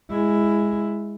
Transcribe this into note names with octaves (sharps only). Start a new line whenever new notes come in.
G#3 E4